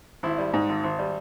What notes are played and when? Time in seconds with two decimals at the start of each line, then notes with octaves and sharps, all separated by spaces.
0.23 G#1 E4
0.38 G3
0.54 G#2
0.69 G#1
0.84 G#1
0.99 G3